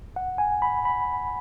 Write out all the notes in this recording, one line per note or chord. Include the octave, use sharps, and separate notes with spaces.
F#5
G#5
B5
B5